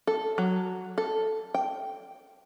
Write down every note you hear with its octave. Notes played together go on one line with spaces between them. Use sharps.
A4
F#3
A4
G5